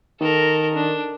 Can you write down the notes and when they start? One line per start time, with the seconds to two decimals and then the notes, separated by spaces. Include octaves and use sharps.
0.21 D#3 A4 A#4
0.74 D4